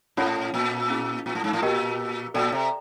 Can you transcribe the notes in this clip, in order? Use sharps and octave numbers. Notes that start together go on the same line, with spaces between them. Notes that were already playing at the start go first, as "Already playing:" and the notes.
A2 C#4 F4 A4 C#5 F#5
A#2
C#4 E4 G#4
A#2
A2
G#2
A2
A#2 G4 A#4 D#5 G5
A#2 A4 D5 G5
C3